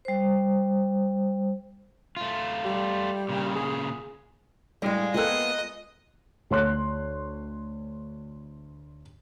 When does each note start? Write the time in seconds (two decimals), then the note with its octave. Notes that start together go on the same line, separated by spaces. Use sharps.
0.05 G3 C5
2.17 A3 F4
2.65 G3
3.29 A#2 C#3
3.55 G#4
4.82 A2 G3 G#3 F5
5.14 A#3 B3 F4 A4 D#5 G5 F#6
6.50 D2 C#5 C6 F#6